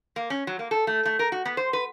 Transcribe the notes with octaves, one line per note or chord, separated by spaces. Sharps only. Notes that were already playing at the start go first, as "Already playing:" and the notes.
A#3
C#4
F#3
A#3
A4
A3
A3
A#4
F#4
B3
C5
B4